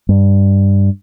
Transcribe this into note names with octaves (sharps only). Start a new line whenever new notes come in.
G2